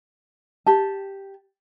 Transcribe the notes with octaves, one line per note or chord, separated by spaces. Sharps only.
G4 A5